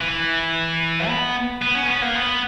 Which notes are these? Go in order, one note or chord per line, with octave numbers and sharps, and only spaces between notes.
E3
B3
B3
C#4
B3
A#3
B3